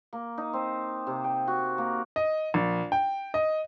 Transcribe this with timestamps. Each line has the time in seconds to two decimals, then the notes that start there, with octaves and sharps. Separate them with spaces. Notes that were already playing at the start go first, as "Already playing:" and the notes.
0.13 A#3
0.38 D#4
0.53 C4
1.07 C3
1.24 G5
1.48 F#4
1.78 A#3
2.16 D#5
2.54 A#1
2.92 G5
3.34 D#5